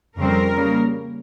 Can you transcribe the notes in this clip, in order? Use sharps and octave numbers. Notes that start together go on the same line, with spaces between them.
F2 C#3 G3 C4 A#4
C#3 G3 A#3